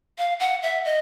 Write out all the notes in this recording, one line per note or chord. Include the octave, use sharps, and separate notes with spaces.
F5
F#5
E5
D#5